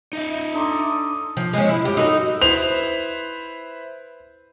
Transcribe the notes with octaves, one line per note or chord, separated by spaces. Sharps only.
D#4 D#5 E5
D4 A4 A#5 C6 D6 D#6
F3
G#3 C#4
E4
G2 G4
D#4 F#4 A4
E4 B4 C5 F7